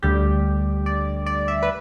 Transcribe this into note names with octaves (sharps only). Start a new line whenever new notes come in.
D2 D3 G3 G4
D5
D5
E5
B4